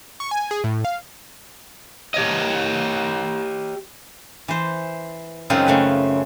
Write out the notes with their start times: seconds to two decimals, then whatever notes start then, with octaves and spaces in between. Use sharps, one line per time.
0.20 C#6
0.31 G#5
0.51 G#4
0.64 A2
0.85 F5
2.14 G4 C#5 D#5
4.48 E3 C5
5.50 F#2 C#3 G#3 C4 D#4 F4
5.66 C#3 A3 B4